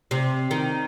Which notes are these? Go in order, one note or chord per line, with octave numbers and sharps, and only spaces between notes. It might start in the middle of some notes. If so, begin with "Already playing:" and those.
C3
D#3